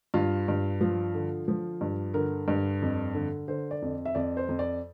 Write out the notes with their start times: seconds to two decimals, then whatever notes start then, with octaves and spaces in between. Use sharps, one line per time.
0.14 G2 F4
0.48 G2
0.81 F3 F4
1.14 D3
1.48 F3
1.81 G2
2.14 D3 A#4
2.48 G2
2.82 F2
3.15 D3
3.48 D3 C5
3.71 D5
3.82 F2
4.05 E5
4.15 F2 D5
4.37 C5
4.49 F2
4.59 D5